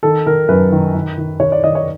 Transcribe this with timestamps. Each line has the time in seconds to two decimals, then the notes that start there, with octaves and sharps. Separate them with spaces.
0.03 D#3 A4
0.27 D#3 A#4
0.48 F#2 B4
0.72 D#3
0.95 D#3
1.18 D#3
1.40 D#3 C#5
1.52 D5
1.63 D#3 D#5
1.75 C#5